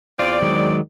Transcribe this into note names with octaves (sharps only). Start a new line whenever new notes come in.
E2 C4 F4 D5
D#3 F#3 G#3